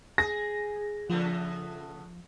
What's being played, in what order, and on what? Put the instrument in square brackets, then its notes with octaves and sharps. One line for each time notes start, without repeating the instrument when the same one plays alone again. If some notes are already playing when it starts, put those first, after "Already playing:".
[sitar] G#4 [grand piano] A#6
[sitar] C#3 A3 B3 [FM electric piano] F3